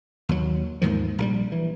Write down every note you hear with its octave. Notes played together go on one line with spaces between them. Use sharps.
D#2 F#3
D#2 G#2 D#3 F3
A#1 C#3 G3
E3